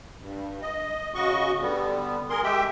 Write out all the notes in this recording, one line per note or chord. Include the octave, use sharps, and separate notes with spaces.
G2
D#5
C#3 F#4 D#5 C#6
D3 G3 B3
G#4 A#4 C6
G#3 G4 E5 G5